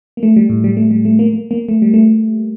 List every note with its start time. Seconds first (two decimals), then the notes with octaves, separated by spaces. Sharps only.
0.17 A#3
0.23 A3
0.36 G3
0.50 A2
0.64 G3
0.77 A3
0.91 G3
1.05 A3
1.19 A#3
1.33 A#3
1.51 A#3
1.69 A3
1.82 G3
1.94 A3